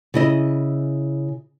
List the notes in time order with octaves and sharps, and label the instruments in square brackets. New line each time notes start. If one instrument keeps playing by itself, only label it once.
[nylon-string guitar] C#3 E4 D#5